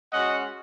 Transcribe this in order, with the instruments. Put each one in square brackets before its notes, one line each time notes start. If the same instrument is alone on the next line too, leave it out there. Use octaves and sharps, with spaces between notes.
[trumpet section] G#3 C#4 F#4 D#5 F#5